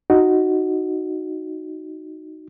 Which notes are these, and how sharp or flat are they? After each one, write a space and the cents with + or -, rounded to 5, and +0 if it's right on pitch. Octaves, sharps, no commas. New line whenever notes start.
D#4 +0 F#4 +0